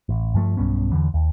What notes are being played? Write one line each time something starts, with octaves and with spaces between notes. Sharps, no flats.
A1
G2 F3 A3
B1 G2 B3 C#4
E2 G#2 D3 E3
D#2